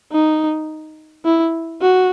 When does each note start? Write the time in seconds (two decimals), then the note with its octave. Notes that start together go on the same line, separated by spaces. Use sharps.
0.12 D#4
1.25 E4
1.81 F#4